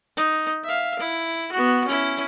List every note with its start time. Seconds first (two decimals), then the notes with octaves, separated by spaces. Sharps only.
0.17 D#4
0.65 E5 F5
0.99 E4
1.52 B3 F#4
1.87 C#4 E4